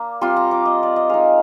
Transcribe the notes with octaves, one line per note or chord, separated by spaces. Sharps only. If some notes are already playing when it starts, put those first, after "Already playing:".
Already playing: A#3 D4
G3 C4 F4 C6
A#5
D6
D#5
D5
D#5
G#3 D#4 F5